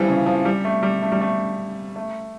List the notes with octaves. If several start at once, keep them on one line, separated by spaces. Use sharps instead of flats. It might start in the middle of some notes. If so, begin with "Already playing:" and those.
Already playing: E3 F3 G3
C#3
F3
G3
A3
G3
A3
G3
A3
A3